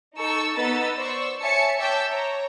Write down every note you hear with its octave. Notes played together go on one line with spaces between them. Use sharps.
D#4 A4 C#6 E6
B3 D#4 B4 D#5 E6 A6
C5 D5 C#6 E6
C#5 E5 G#5 A5 C#7
C#5 E5 G5 A5 D6 E6
C#5 A#5